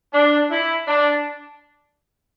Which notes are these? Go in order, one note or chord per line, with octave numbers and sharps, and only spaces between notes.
D4
E4
D4